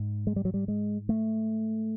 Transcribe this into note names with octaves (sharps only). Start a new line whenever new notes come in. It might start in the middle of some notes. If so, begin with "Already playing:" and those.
Already playing: G#2
G#3
G3
F#3
G3
G#3
A3